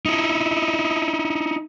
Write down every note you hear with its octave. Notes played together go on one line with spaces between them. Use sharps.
D#4 E4